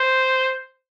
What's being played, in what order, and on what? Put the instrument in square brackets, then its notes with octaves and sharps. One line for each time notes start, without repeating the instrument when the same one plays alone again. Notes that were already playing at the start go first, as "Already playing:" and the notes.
Already playing: [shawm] C5